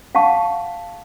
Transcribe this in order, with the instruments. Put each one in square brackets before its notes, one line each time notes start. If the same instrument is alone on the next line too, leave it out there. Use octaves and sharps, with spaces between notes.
[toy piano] F5 F#5 A5 C#6